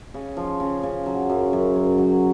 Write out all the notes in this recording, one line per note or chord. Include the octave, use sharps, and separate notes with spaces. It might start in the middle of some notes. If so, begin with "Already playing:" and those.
C#3
F3
C#3
C#3
F#3
F#2
F#2
F#2
F#3